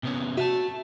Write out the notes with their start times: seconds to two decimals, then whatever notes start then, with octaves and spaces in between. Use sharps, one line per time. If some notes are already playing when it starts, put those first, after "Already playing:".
0.03 C3 B3 C#4
0.37 F#4 E5 F5 A5